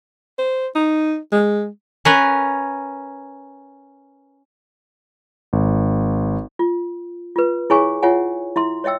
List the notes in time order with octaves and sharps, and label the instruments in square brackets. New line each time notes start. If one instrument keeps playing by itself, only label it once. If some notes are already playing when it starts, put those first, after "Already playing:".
[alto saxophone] C5
D#4
G#3
[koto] C#4 A#4 B4
[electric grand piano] G#1
[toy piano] F4
F4 B4
E4 G#4 C#5 F5 G#5 C#6
F4 C#5 E5 F#5 G#5
E4 E5 C6
C#5 D#5 E5 G5 E6